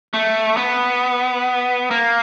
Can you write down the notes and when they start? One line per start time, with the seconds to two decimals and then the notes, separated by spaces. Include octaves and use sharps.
0.14 A3
0.57 B3
1.91 A#3